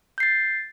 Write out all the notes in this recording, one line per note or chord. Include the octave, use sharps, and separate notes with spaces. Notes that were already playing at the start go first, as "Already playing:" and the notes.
G6 A6 C7